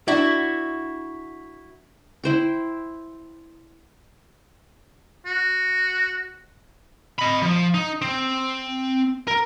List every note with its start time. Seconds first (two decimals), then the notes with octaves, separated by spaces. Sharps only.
0.08 D4 E4 F#4
2.24 E4 C5 G5
5.26 F#4
7.19 D#5 B5
7.42 F3
7.74 D#4
8.02 C4
9.28 A#4